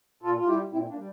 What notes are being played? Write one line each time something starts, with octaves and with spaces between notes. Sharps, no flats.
A#2 F4 A4
F4
G3 E4 G4
A#2 C4 E4
A#3 D4
G3